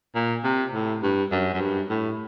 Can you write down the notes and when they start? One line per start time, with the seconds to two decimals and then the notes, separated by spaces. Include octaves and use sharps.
0.15 A#2
0.44 C3
0.74 A2
1.03 G2
1.32 F#2
1.54 F#2
1.61 G2
1.90 A2